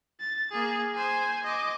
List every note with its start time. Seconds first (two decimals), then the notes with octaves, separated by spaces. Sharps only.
0.20 A6
0.52 A#3 G#4
0.95 C5 G#5
1.44 D#5 D6